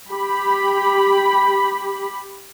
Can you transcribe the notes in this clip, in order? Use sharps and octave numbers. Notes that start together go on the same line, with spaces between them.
G4 B5